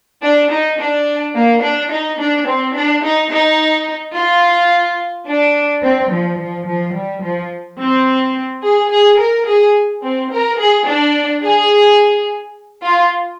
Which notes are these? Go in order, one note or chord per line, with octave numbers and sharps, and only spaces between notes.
D4
D#4
D4
A#3
D4
D#4
D4
C4
D4
D#4
D#4
F4
D4
C4
F3
F3
F3
G3
F3
C4
G#4
G#4
A#4
G#4
C4
A#4
G#4
D4
G#4
F4